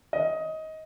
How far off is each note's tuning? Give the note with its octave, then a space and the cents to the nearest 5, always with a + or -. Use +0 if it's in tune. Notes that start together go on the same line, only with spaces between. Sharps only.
D#5 +20